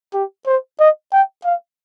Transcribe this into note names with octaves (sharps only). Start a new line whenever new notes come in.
G4
C5
D#5
G5
F5